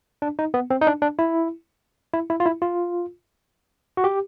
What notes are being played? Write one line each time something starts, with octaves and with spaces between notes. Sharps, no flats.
D4
D#4
B3
C4
D#4
D4
D4
E4
E4
E4
F4
E4
F4
F#4
G4